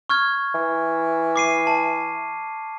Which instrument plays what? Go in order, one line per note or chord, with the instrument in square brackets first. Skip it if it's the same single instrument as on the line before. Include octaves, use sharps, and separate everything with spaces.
[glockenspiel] C#6 F6 G#6
[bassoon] E3
[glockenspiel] D6 C7 D#7
A5